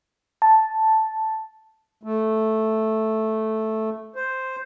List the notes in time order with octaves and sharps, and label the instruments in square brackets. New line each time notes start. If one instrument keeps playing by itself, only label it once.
[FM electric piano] A5
[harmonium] A3
C5